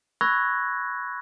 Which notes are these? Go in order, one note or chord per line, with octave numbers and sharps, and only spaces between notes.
B5 C#6 E6 F#6 G#6 A#6